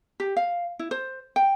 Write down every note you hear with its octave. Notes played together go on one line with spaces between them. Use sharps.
G4
F5
E4
C5
G5